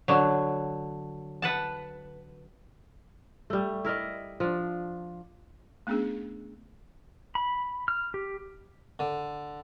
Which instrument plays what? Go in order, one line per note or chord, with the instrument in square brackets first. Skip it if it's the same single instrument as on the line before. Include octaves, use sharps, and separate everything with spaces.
[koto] D3 F#3
B4 F#5 A5
[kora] G3 A3
E4 A#4 D5 D#5
F3 D4
[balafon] A3 B3 C#4 D4 G#4
[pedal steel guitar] B5
F6
G4
[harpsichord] D3